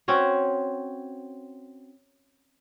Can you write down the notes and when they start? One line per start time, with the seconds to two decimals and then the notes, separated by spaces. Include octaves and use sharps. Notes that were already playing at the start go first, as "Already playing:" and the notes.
0.08 C4 C#4 F#4 C#5